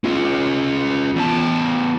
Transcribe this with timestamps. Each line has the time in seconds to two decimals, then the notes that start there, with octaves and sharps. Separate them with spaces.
0.04 C#4 F4
1.15 E2 A5